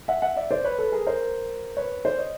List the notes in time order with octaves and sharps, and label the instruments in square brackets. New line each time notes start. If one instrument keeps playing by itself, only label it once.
[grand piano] E5 F#5
E5 F#5
D5 E5
C5 D5
B4 C#5
A4 B4
G#4 A#4
A#4 C5
B4 C#5
C5 D5
C#5 D#5